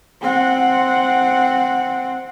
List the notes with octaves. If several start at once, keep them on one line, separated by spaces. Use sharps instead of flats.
C4 F#5